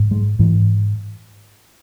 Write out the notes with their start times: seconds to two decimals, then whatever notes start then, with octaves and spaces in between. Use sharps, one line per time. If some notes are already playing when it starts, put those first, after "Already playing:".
Already playing: G#2
0.11 G#3
0.39 G#2 E3